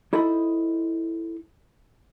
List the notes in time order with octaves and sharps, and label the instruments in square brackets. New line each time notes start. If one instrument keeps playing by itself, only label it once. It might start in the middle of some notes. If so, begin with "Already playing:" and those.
[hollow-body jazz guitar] D#4 E4 A4 C5 D#5 B5